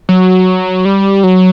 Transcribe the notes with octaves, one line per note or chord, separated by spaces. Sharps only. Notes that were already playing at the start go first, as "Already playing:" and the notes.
F#3
G3
F#3